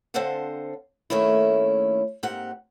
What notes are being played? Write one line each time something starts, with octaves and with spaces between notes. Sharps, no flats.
D3 C4 D4 C5 F5 F#5
D#3 A3 A#3 C#4 E4
G#2 A#3 C4 G4 F#5